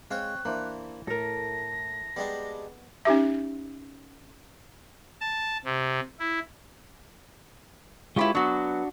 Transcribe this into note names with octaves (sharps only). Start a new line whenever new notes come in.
G#3 C4 C#5 F5 F#6
E3 A#3 D4 C5
A2 A4 A#4 A#6
G3 G#3 B3 D4
C#4 D#4 G4 E5
A5
C3
E4
G#3 E4 F4 G4 B4 C#5
F#3 B3 D4 F#4